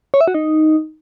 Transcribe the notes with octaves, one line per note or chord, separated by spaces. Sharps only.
C#5
E5
F#4
D#4